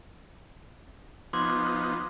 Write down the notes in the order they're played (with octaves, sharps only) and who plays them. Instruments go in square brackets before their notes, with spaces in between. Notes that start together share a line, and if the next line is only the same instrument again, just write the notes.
[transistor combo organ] F3 B3 D#4 [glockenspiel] C6 D6 G#6